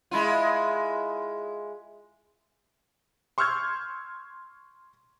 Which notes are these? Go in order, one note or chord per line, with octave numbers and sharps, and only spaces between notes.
G#3 E4 F4
C6 C#6 E6 F6 G6 G#6